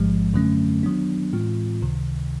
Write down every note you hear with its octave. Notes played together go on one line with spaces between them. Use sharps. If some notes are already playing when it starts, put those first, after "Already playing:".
Already playing: A1 G#2 F3 G#3
F#2 D3 F#3 A3 C#4
D#3 F#3 B3 D4
A2 E3 G#3 C4 F4
C#2 C3 D#3